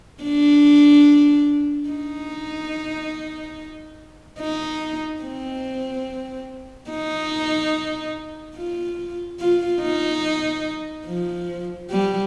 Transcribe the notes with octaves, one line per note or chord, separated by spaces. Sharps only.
D4
D#4
D#4
C4
D#4
F4
F4
D#4
F3
G3